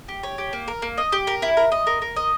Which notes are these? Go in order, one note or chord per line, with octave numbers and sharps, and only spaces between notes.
G4
C#5
G4
A#3
A#4
A#3
D#5
G4
A#4
E4
A#4
D#5
A#4
A#4
D#5